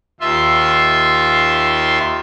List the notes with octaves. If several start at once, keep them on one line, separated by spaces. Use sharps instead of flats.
D#2 F4 E5 C6